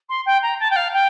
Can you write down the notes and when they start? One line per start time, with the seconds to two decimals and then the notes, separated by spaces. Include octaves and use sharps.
0.09 C6
0.26 G5
0.42 A#5
0.59 A5
0.70 G5
0.76 F5
0.93 G5